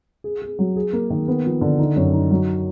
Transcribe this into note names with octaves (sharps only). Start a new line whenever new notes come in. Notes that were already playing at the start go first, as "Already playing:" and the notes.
G#4
G#4
F#3
G#4
A#3
D#3
B3
F3
D3
D#4
F#2
D#4
F#3